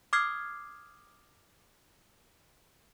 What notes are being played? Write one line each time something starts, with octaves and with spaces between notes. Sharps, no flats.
D6 D#6 F6 G#6 C7